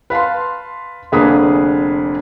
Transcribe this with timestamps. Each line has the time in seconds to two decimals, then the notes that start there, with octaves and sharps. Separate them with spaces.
0.10 B4 F5 A5 C6
1.12 F1 D3 A#3 G#4 B4 D#6